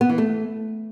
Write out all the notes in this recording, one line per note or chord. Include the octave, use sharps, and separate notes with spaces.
B3
E3
A3